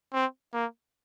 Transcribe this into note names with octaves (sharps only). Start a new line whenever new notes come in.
C4
A#3